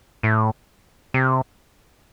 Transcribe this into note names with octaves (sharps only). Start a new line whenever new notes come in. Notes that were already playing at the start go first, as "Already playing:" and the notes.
A2
C3